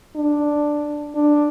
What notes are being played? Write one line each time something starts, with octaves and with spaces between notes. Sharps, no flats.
D4
D4